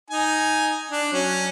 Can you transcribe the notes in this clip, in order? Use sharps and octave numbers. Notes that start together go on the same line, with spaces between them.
D#4 G#5
D4
F#3 C#4